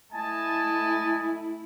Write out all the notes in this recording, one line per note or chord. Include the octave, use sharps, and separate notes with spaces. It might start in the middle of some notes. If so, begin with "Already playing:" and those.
A3 E4 D#5 G#5 A5